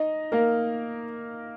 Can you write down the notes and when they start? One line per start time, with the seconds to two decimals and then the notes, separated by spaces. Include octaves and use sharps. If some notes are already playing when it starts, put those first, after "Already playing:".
Already playing: D#4 D#5
0.32 A#3 A#4